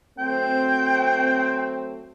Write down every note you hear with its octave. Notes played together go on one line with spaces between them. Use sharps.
F#3 A3 C4 G5